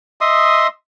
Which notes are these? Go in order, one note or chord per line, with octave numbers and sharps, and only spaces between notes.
D#5 E5 C6 D#6